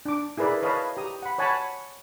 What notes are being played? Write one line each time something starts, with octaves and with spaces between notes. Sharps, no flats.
D4 D6
E4 G#4 A#4 B4 D5 E5
B4 C#5 D#5 F5 A5 B5
G4 A#5 D#6
F#5 B5
C#5 F#5 G#5 A5 B5